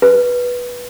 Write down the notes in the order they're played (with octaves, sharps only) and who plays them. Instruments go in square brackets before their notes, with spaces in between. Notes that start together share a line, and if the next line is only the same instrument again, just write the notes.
[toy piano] B4